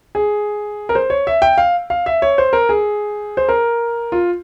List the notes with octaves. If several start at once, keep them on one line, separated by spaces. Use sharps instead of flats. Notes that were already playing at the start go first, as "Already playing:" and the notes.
G#4
A#4
C5
C#5
E5
G5
F5
F5
E5
C#5
C5
A#4
G#4
C5
A#4
F4